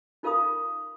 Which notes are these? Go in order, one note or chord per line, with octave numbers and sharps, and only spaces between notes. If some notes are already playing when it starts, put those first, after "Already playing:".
D#4 F4 A#4 F5 B5 D#6